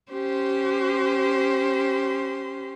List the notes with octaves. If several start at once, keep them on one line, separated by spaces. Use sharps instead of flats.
C#4 G4 C5 C6